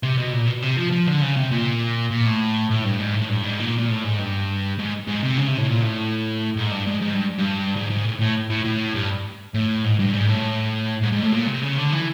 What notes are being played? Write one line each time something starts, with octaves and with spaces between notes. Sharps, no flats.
C3
B2
A#2
B2
C3
F3
F3
D3
C#3
C3
A#2
A#2
A2
A2
G2
G#2
A2
G2
G#2
A#2
A#2
A2
G#2
G2
G#2
G#2
C3
C#3
C3
A2
A#2
A2
G#2
G2
G#2
G#2
G2
G2
G#2
G#2
A2
A2
A2
A2
G2
A2
G#2
G2
G#2
A2
G#2
G#2
A2
A#2
C3
C#3
D3
E3